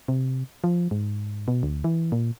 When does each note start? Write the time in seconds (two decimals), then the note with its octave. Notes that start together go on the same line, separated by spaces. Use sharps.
0.08 C3
0.64 F3
0.91 G#2
1.48 B2
1.63 D2
1.84 E3
2.12 A#2